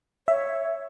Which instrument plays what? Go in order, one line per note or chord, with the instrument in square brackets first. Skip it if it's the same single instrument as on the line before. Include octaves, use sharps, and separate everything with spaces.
[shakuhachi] C#5 [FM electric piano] E5